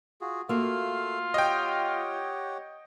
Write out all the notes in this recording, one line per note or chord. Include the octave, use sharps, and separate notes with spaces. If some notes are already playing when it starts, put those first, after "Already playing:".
F4 F#4 G#4
A3 A#3 F4 F#4 F5 E6
G4 C#5 D#5 F#5 G5